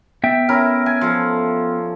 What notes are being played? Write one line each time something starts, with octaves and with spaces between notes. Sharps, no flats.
B3 E5 G5
C#4 E4 A#4
G#5
F3 A4